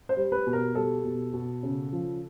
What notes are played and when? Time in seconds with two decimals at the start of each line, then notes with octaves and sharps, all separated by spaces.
0.09 C5
0.17 G3
0.32 B4
0.47 B2
0.53 A#4
0.75 G3 A4
1.04 B2
1.33 B2
1.63 C#3
1.93 F3